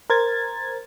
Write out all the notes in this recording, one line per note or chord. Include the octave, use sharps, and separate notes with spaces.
A#4 C5 G#6 A6